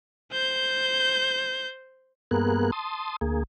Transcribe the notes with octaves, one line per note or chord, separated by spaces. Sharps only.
C5 G6
G2 A#3 B3 G#4 A#4 F#6
A5 C6 D#6
D2 A#3 G#4